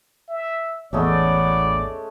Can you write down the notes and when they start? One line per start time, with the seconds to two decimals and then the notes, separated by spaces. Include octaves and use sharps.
0.29 E5
0.93 A1 E2 G#3 A3 B3 C#4 D5